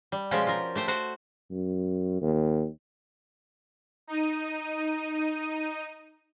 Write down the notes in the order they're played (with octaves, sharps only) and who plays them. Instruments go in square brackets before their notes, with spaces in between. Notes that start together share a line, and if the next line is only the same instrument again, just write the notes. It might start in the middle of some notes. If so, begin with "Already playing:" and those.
[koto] G3
B2 F3 G#3 C#4 F4 G4
F4 A#4
A3 G4 C5
F#4 C5 D5 F#5
[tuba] F#2
D#2
[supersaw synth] D#4 D#7